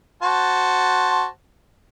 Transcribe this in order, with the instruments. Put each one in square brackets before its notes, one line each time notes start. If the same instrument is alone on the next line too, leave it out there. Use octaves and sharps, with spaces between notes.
[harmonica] F#4 C5 A5